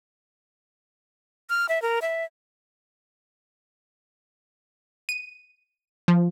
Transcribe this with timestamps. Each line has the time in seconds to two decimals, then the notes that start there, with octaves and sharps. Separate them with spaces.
1.50 F6
1.69 E5
1.82 A#4
2.02 E5
5.09 D#7
6.08 F3